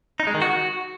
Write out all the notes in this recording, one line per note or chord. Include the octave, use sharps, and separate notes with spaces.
D#4
G#3
D#3
F#4